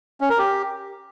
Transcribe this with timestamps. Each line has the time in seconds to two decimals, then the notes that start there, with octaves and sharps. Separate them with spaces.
0.21 C#4
0.30 A#4
0.39 G4